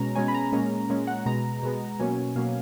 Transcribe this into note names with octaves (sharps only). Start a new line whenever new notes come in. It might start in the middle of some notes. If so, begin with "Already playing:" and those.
Already playing: B2 G#3 C#4 A#5
B2 G#3 C#4 G#5
B5
A#5
A#2 G#3 C#4
A#2 G#3 C#4
F#5
B2 G#3 B3 A#5
B2 G#3 B3
B2 F#3 A#3 C#4 G#5
B2 F#3 A#3 C#4 F5